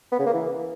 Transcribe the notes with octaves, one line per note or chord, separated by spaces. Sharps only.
B3
C#3
A#3
E3